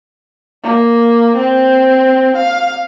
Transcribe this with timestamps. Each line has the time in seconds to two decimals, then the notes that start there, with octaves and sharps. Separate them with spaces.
0.63 A#3
1.36 C4
2.37 F5